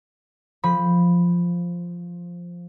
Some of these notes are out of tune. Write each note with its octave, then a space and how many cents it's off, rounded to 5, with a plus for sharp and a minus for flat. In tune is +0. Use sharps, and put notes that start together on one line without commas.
F3 +0 B5 +0